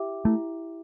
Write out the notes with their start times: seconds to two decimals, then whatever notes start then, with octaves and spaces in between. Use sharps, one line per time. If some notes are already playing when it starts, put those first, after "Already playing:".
Already playing: E4 G4 E5 G5 D6
0.25 A3 E4